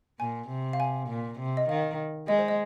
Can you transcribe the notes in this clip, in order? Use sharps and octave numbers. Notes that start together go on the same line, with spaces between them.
A#2 G#5
C3
F5
G#5
A#2
C3
D#5
D#3 F5
G#3 D#5
C5
D#5